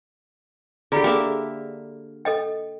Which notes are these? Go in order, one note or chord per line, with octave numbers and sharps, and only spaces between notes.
D3 G4 G#4 A#5 B5
A#3 G#4 E5 G5
A4 D#5 G5